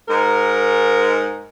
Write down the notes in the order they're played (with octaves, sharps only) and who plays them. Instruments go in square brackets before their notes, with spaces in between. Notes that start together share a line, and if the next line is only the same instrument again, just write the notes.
[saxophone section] G#2 A#4